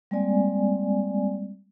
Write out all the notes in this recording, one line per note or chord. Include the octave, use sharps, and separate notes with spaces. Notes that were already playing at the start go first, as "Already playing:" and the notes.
G3 G#3 A#3 C4 D5 G#5